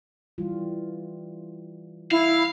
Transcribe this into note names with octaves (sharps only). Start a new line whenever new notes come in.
E3 G3 F4
E4 F5